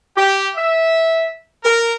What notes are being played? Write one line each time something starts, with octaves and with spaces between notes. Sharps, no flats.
G4
E5
A#4